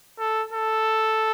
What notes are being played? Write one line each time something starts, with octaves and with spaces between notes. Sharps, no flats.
A4
A4